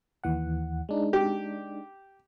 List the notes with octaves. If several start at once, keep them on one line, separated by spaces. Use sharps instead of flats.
D#2 E3 F#5
G#3 D4 D#4
G4